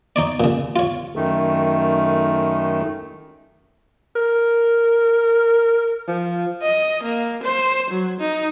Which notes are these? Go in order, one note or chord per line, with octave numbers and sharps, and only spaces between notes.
D#4 C#5 D5
A#2 C#3
F4 C#5
F#2 D#3 A3
A#4
F3
D#5
A#3
C5
F#3
D#4